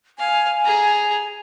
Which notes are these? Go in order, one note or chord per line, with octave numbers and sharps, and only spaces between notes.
F5 G#5
G#4 A#5